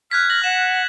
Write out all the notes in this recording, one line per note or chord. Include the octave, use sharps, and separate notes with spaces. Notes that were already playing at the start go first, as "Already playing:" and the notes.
F6 F#6 G#6 B6
A#6 F#7
F#5 E7